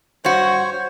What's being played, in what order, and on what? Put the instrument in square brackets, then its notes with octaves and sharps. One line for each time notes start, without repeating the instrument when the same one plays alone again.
[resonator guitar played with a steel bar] G2 F#4 [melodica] C5 C#5